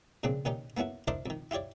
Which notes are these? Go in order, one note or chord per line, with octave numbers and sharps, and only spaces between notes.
A#2 C#3 F3 C4 D4
A#2 D#3 C#4 D#4 G4
A#3 B3 C#4 E4 F#4
D4 E4 A#4 C5 D5 D#5
F2 D#3
E4 F4 G4 C#5 D5